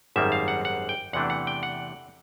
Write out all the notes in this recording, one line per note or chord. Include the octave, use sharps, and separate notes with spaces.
G#1 F#2 D#3 G3 A#3 E5
F5
F#5
F#5
G5
E2 C3 E3 A3 D4 F#5
F#5
G5
F#5